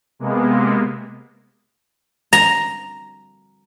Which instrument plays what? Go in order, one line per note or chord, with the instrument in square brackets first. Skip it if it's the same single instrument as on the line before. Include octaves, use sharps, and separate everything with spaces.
[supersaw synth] C3 G#3 A#3 B3
[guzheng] A#5